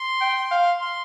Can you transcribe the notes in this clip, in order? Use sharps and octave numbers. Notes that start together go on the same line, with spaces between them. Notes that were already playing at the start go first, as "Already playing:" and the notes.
Already playing: C6
G5
F5
C6